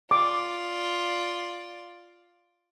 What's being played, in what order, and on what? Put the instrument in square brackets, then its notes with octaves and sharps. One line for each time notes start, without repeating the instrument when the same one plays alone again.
[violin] F4 D5 [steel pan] D6